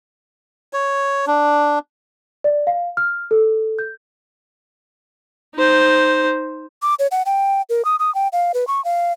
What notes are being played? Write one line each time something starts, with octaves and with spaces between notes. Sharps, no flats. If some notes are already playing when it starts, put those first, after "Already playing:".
C#5
D4
D5
F5
F6
A4
G6
D#4 C5
D6
C#5
F#5
G5
A#4
D#6
D#6
G5
F5
B4
C#6
F5